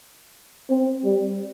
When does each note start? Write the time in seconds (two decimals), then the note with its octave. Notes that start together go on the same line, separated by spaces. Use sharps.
0.70 C4
1.05 G3